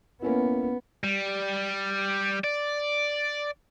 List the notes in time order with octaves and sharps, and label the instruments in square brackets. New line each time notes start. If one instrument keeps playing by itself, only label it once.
[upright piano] A#3 C#4 E4 [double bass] B3
[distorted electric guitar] G3
D5